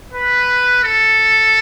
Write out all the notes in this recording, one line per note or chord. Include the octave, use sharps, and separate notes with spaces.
B4
A4